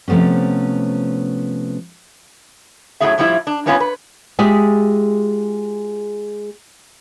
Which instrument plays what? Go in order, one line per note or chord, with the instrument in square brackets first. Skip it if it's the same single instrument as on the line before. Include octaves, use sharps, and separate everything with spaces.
[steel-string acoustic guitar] C3 F3 A3 B3 C#4
[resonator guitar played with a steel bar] F#2 A2 F#3 B3 G#4 E5
A2 F3 G3 C4 E4 F4
D4
G3 A#3 B3 C#4 F4 B4
B4
[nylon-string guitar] G#3 F4 G4 G#4 E5